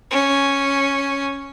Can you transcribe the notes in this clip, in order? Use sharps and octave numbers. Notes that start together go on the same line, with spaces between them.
C#4